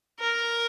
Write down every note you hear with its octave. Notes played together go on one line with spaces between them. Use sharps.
A#4